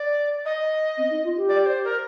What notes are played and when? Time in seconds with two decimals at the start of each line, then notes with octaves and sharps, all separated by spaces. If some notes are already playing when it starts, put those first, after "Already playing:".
Already playing: D5
0.45 D#5
0.97 C4
1.10 D#4
1.24 F4
1.36 G4
1.49 D5
1.62 D5
1.66 C5
1.84 A#4